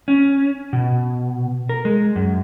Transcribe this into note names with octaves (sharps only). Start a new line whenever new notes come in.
C#4
B2
A#4
G#3
F#2